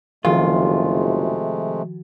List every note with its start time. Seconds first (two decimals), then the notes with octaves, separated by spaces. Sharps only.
0.25 F#1 C3 D#3 F3 G#3 A3 F4 F#4